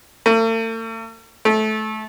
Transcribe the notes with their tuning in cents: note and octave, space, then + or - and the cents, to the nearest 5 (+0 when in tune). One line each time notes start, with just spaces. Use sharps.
A3 +45
A3 -20